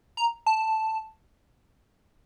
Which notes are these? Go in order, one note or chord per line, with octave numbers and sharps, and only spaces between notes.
A#5
A5